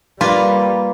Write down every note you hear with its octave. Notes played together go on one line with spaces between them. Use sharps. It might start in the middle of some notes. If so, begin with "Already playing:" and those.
G3 A#3 F4 B4